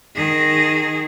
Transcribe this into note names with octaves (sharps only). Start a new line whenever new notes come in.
D#3 G#4